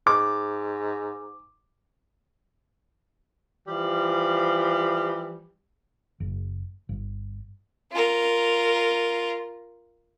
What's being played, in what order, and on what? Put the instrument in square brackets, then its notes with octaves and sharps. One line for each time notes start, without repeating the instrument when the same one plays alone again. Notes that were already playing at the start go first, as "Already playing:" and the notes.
[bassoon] G#2 [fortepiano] D6
[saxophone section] E3 F3 G3
[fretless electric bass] F#1
G1
[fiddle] F4 A#4